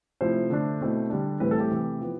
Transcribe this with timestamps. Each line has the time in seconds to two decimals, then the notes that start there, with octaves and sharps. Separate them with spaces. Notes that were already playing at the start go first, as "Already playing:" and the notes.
0.21 C3 F3 A3 E4 C5
0.50 D3 A3 D4
0.81 B2 A3 C4 E4
1.10 D3 G3 D4
1.40 A2 E3 G3 C4 E4 B4
1.51 A4
1.60 G4
1.71 C3 E3 A3
2.01 F3 B3 E4